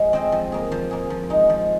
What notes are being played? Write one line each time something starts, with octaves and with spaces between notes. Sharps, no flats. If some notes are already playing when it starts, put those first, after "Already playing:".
Already playing: F3 G#3
C4 G#4 C5 D#5
F3
A#3 G#4
F3
A#3 G#4
F3
G#3 D#4
F3